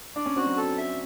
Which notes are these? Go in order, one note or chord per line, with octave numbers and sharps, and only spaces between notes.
D4 D5
C#4
C4 F#4
F#3
A4
E5